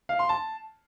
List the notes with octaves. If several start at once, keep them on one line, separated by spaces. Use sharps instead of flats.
F5
C6
A5